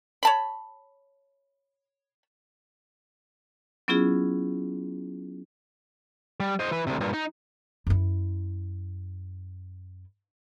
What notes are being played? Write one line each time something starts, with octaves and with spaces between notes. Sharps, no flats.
C#5 A5 B5
F#3 B3 C#4 E4 F4 G#4
G3
C5 D#5
E3 B4
D2 C3
G2 A#2
D#4
F#2 E4